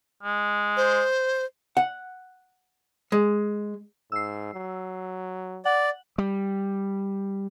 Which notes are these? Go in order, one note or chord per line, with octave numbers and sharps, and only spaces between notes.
G#3
C5
F#5
G#3
G#2 E6 C7
F#3
D5 F#5
G3